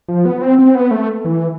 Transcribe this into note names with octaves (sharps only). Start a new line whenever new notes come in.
F3
B3
C4
C4
B3
A3
E3